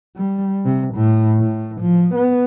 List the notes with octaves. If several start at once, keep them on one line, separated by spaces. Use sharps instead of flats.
G3
C3
A2
A2
F3
B3